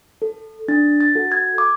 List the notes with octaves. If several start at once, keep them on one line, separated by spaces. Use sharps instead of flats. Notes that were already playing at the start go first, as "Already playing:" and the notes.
A4
D4 A6
A6
F#4 A4
G#6
D6